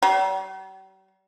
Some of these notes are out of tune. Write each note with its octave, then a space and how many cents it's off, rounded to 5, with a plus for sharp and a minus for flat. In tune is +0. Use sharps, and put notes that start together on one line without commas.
G3 -45